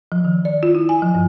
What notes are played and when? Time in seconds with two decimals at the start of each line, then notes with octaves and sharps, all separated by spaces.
0.12 F3
0.25 D#3
0.45 D5
0.63 F4
0.75 E4
0.89 G#5
1.02 F3
1.15 G2